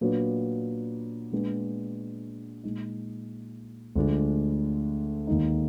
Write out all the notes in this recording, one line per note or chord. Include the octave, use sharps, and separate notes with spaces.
A#2 F#3 B3 D4
A#2 G#3 B3 D4
A#2 G#3 D#4
D2 D3 F3 G#3 D4
D#2 D#3 G#3 D#4